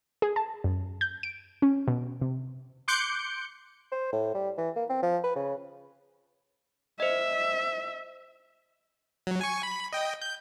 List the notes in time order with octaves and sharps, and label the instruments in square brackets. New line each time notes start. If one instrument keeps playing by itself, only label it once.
[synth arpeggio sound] G#4
A5
F#2
G6
D7
C#4
B2
C3
[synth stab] C6 D6 F#6 G6 C#7 D7
[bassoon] C5
A2
G3
E3
A#3
C4
F3
B4
C#3
[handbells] C5 D#5 [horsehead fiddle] E5
[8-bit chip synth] F#3
G#5 C#6
B5
D#5 G5
G6